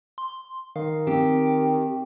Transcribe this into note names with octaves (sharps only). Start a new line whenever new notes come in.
C6
D#3 F5
C4 G4